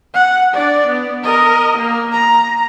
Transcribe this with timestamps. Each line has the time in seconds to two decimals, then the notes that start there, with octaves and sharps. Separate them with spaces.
0.14 F#5
0.54 D4 D5
0.86 B3
1.24 A#4 D#5
1.77 A#3
2.12 A#5